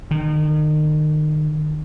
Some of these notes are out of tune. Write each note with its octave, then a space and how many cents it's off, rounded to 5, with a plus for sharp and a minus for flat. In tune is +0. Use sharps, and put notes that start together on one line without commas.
D#3 -35